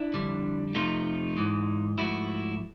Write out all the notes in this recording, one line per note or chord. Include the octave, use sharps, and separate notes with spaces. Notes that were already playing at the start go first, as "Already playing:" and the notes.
Already playing: D4 E4
F2 D3 G3
F2 C3 F3 A3 D#4 F4
G#2 E3 G#3
G#2 F3 A3 E4 F#4